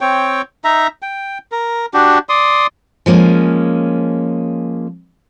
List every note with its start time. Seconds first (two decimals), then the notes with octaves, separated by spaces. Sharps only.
0.01 C4 C#5 G5
0.64 D#4 E5 A#5
1.02 G5
1.52 A#4
1.94 D4 F#4 G4
2.29 D5 C6 D#6
3.06 F3 G#3 A#3 C#4